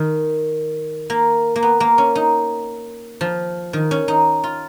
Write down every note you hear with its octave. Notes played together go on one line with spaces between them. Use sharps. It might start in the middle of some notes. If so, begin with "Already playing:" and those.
Already playing: D#3
A#3
A#3
B3
A#3
C#4
D#4
F3
D#3
C#4
D#4
F4